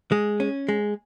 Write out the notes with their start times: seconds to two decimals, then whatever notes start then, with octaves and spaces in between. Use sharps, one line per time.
0.12 G#3
0.40 C#4
0.69 G#3